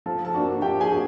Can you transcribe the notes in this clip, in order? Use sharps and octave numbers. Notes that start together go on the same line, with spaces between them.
F3 A4 A5
A4 A5
A#3 D4 F#4
F3 G4 G5
G#4 G#5
D4 F#4